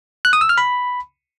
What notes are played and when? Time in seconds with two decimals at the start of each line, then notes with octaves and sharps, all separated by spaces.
0.25 F#6
0.33 D#6
0.41 E6
0.49 F6
0.58 B5